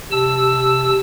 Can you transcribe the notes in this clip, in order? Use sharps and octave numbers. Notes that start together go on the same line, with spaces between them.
C3 A5 E6